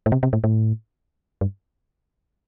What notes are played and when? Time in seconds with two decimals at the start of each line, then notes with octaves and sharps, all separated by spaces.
0.06 A2
0.12 C3
0.23 C3
0.33 A2
0.44 A2
1.41 G2